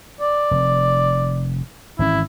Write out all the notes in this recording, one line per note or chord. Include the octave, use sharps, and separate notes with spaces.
D5
F1
G#1 E3 C#4 E4